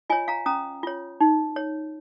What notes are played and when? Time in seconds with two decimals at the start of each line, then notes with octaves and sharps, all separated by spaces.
0.10 F4 C#5 D#5 G#5
0.28 F5 A#5
0.46 C#4 A#5 D#6
0.83 F4 C#5
1.20 D#4
1.56 C#5